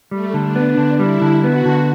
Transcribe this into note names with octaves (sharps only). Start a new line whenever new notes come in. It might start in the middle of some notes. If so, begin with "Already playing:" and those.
G3 A3
D3
D4
B3
D4
D3
G3 E4
D3
B3 F#4
D3